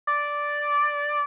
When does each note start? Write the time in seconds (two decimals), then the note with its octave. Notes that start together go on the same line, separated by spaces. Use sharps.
0.07 D5